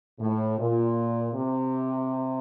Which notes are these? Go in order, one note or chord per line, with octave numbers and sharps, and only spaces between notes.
A2
A#2
C3